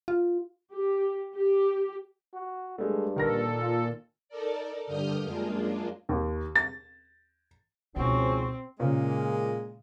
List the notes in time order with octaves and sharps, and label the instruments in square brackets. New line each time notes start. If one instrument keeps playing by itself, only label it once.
[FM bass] F4
[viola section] G4
G4
[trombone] F#4
[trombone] G2 [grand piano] G#3 A3
[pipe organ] A#2 A4 [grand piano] D#3 A#4 A#6
[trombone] F4
[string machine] D#4 A4 A#4 D5
G2 D3 G3 D#6 F6 G6
F#2 G#3 A#3 D4 F4
[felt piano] D#2
A6
[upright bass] C#2 B2 [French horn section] G#2 F3 C#4 [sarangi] C4 [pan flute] F#4
[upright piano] A#2 C#3 [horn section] G#3 A#3